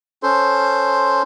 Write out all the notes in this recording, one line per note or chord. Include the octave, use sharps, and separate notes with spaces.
C#4 A4 C5 C6